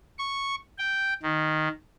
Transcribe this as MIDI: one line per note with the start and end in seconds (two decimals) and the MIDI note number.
0.19 0.55 85
0.78 1.14 79
1.23 1.68 51